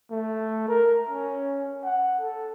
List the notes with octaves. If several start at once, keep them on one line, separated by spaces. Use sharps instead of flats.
A3
A#4
C#4
F#5
A4